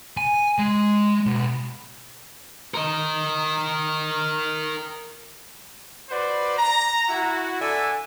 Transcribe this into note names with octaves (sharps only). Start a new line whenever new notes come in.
G#5
G#3
B1
A#4 D#5
F#4 B4 C5 D5
A#5
E4 F#4
D3 A4 E5 G#5